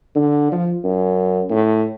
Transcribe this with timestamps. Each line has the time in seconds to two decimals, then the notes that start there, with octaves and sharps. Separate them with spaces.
0.15 D3
0.52 F3
0.84 F#2
1.50 A2